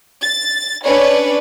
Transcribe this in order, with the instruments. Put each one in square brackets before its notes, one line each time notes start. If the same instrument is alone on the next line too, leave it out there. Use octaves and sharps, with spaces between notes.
[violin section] A6
C#4 D4 B4 C#5 D5